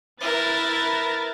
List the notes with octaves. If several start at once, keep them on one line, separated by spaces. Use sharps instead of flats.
E4 A#4 B4 A6